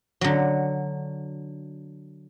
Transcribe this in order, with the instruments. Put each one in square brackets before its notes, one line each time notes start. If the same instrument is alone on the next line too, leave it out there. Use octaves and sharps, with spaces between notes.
[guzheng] D3 F#3